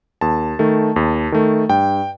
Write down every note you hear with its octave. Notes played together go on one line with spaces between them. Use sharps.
D#2 A5
D#3 A3
D#2
D#3 A3
G2 G5